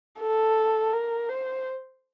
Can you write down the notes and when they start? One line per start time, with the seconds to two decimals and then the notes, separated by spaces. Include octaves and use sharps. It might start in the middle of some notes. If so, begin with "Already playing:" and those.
0.20 A4
0.93 A#4
1.29 C5